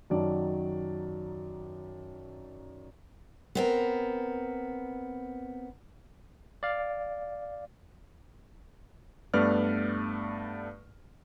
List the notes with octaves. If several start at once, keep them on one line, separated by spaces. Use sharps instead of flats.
F#2 D#3 F#3 D5 A5
B3 C4 A#4
D5 F5
G2 A3 B3 B4 D5 F6